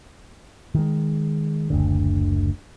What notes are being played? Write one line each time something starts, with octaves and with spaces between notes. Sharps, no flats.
D#3 G#3
F#1 D2 D3